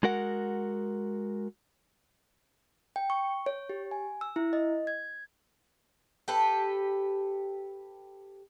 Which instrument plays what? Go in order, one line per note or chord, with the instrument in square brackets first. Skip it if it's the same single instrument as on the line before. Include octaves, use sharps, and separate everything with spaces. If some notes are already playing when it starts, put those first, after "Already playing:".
[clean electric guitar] G#3 F#4 A#4 F#5
[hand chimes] G5
C#6
C#5
G4
G#5
E6
E4
D#5
G#6
[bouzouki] G4 A4 B4